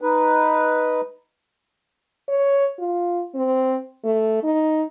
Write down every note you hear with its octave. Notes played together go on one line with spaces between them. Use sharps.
D#4 B4
C#5
F4
C4
A3
D#4